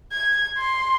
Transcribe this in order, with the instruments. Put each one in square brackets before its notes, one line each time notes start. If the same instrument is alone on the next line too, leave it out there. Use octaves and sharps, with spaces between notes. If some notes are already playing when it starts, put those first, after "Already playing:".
[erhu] G#6
C6